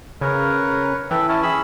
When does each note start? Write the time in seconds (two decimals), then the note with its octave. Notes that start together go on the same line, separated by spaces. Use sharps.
0.21 C#3 A#4 B4 C#5
1.11 E3 A4 E5 G5
1.29 C#4 E4 A5
1.43 G#4 B5 E6